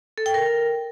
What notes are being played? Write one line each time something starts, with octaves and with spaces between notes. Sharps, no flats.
A4
G5
A#4